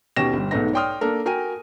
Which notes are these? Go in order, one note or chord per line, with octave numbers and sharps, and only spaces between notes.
D#2 B2 C#4 G4 A#6 E7
G1 G3
B1 G#2 A3 B3 D#4 A#6
C#5 D5 G5 C6 D#6 F6
A#3 D4 A4 A#4
F#4 A#4 G5 G#5 D#7